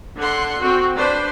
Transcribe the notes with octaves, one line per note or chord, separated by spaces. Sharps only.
D3 F#5 C6
C4 F#4
D4 B4 C5